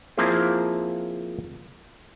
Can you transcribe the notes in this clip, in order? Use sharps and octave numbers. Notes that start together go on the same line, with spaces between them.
F3 A#3 C4 E4 G#4